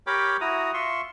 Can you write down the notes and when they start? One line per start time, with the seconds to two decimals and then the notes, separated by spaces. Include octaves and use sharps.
0.07 G4 A#4 C#5 G5 B5 D6
0.41 E4 F#4 A#5 D#6
0.74 F4 E5 C6 C#6